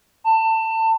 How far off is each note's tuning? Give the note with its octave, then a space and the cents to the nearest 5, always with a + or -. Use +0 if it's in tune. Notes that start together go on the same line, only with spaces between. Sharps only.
A5 +25